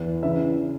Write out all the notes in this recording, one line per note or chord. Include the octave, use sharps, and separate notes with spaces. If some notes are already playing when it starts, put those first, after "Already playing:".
Already playing: E2 E3
C#3 E3 E5